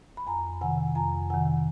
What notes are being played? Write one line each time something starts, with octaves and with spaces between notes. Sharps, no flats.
B5
F2 G#5 A#5
C3 D#3 F#5 G#5
F2 G#5 A#5
C3 D#3 F#5 G#5